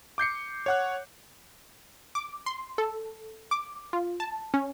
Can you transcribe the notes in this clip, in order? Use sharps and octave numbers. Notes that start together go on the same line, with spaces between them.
D6 G6 C7 C#7
C#5 F#5 F#6
D6
C6
A4
D6
F4
A5
C#4